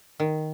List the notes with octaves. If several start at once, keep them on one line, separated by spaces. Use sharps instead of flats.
D#3